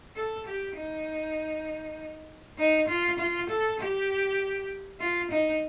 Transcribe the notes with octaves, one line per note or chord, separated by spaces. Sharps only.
A4
G4
D#4
D#4
F4
F4
A4
G4
F4
D#4